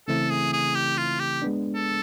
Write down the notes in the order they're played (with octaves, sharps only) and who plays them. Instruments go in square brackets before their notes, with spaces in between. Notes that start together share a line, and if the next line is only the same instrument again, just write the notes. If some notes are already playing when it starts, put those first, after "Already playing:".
[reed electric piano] C#3 E3 A3 C4 E4 [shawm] A4
[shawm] G#4
G#4
G4
F4
G4
[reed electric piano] G#3 B3 D4
[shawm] A4